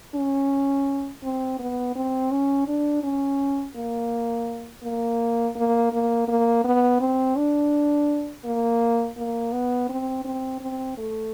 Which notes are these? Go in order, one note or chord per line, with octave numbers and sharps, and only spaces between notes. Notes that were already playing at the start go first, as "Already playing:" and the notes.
C#4
C4
B3
C4
C#4
D4
C#4
A#3
A#3
A#3
A#3
A#3
B3
C4
D4
A#3
A#3
B3
C4
C4
C4
A3